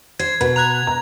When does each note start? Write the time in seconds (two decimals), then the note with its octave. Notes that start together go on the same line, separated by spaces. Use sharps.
0.19 C5 G#6
0.41 B2 B4
0.56 A#5 F#6 G#6 F7
0.87 A#5